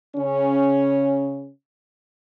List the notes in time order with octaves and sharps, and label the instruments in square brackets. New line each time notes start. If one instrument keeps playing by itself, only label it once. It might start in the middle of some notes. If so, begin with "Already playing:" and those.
[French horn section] C#3 C#4